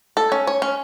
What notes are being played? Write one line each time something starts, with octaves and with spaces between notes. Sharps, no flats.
A4
C#4
C#5
C#4